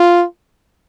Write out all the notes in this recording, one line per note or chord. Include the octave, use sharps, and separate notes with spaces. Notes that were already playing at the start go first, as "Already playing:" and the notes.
Already playing: F4